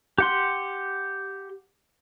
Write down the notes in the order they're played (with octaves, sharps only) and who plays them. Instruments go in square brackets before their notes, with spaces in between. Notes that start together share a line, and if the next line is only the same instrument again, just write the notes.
[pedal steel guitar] G4 F#5 C6